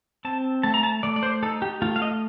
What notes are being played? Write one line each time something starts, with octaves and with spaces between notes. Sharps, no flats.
C4 A5
A3 A5
A#5
A5
A3 D5
D5
C5
D#4 A4
G4
A3 F4
F5
D#5